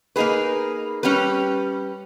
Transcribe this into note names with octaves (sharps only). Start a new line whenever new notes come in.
A#3 D#4 G#4 B4
G3 C#4 G4 B4